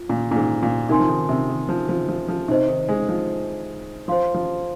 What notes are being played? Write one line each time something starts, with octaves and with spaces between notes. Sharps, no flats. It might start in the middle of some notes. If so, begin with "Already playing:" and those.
Already playing: F4
A#2
A#2
G#2
A#2
C3 D#4 A#4 G#5 C6
F3
D#3
C3
D#3
F3
F3
F3
F3
C3 D#4 C5 D#5
D#3
G#3
F3
F3 C5 F5 C6
F3